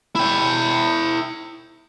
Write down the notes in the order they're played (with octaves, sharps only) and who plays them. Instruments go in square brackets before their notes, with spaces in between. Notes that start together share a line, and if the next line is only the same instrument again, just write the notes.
[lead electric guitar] E4 G5